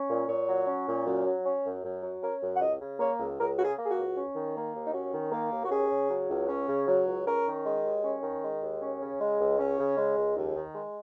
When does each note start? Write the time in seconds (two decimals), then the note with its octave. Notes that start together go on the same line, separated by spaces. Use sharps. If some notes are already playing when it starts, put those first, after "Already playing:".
Already playing: C#4
0.09 A#2
0.28 A#2 C#5
0.49 F#3
0.67 C#4
0.87 A#2
1.07 F#2
1.26 F#3
1.46 C#4
1.65 F#2
1.84 F#2
2.03 F#3
2.22 C#4 A#4
2.42 F#2
2.56 F#5
2.61 C#2 D#5
2.81 C#3
3.00 A#3 C#5
3.19 C#2
3.39 C#2 A#4
3.58 C#3 F#4
3.65 G#4
3.78 A#3
3.86 G#4
3.91 F#4
3.97 C#2
4.16 C#4
4.35 D#3
4.56 A#3
4.74 D#2
4.86 D#4
4.94 C#4 F#4
5.13 D#3
5.32 A#3
5.52 D#2
5.65 F#4
5.71 C#4 G#4
5.90 C#3
6.11 F#3
6.30 C#2
6.49 C#4
6.68 C#3
6.88 F#3
7.07 C#2
7.26 C#4 A#4
7.46 D#3
7.65 G#3
7.84 D#2
8.03 C#4
8.23 D#3
8.43 G#3
8.62 D#2
8.82 C#4
9.01 C#3
9.21 G#3
9.39 C#2
9.59 C#4
9.79 C#3
9.98 G#3
10.17 C#2
10.37 D#2
10.55 D#3
10.75 G#3